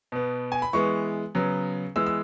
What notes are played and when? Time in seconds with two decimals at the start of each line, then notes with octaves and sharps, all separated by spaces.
0.12 B2 B3
0.52 G#5
0.62 B5
0.73 E3 G#3 B3 C#6
1.35 C#3 F#3 B3
1.96 E3 G#3 B3 E6
2.06 E6